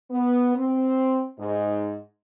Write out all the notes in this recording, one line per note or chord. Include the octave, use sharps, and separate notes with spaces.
B3
C4
G#2